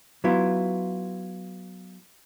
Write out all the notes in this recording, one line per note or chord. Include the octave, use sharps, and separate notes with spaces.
F#3 B3 E4 F4